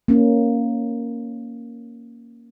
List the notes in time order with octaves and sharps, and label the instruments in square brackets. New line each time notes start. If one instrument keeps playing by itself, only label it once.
[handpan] A#3 C#4